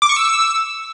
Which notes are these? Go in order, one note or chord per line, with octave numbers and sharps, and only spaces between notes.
D6
C#6
E6